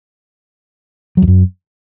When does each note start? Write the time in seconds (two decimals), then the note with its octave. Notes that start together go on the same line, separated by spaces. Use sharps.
1.17 F#3
1.22 E2
1.28 F#2